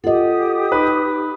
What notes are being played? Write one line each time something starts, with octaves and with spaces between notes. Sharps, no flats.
F4 G4 A4 D#5 F#5 D#6
D#4 B4